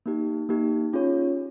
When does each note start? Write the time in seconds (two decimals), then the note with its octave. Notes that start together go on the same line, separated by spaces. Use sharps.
0.06 A#3 D#4 G4
0.49 A#3 D#4 G4
0.93 C#4 F4 G#4 C#5